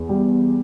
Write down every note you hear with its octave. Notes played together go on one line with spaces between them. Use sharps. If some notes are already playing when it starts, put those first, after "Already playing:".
Already playing: E2
G3